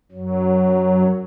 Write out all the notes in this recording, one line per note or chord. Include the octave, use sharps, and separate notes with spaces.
F#2 F#3